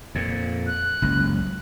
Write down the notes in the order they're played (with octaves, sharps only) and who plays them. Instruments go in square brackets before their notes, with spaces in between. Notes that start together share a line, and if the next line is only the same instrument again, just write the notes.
[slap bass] F2 A#2
[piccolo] F#6
[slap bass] F#1 C#2